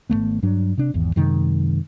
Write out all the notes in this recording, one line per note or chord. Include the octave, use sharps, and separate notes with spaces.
G#1 F#2 A3 B3
G2 F#3 D4
C3 D4
G#1 E2
F#2 C3 D#3 G#3